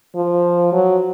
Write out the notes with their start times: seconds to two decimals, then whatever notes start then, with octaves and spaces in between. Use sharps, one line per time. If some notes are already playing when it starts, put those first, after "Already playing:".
0.15 F3
0.72 F#3